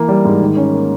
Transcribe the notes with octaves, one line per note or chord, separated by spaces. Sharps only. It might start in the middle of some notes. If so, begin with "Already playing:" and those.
Already playing: E3 A#3
G3
G#2
D#3
C#4
A#3